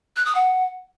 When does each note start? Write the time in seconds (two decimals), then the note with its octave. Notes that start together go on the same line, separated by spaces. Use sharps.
0.16 F#6
0.26 D#6
0.35 F#5